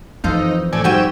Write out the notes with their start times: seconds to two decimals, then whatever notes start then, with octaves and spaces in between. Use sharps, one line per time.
0.24 F2 E3 D#4 A4 C5 F5
0.73 A2 A4 D5 G#5
0.84 G#2 G3 F#4 G5 G#5 E6